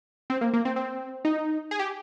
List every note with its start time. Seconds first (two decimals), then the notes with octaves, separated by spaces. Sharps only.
0.30 C4
0.41 A#3
0.53 A#3
0.65 C4
0.76 C4
1.25 D#4
1.71 G#4
1.80 G4